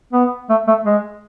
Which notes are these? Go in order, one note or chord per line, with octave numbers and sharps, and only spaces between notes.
B3
A3
A3
G#3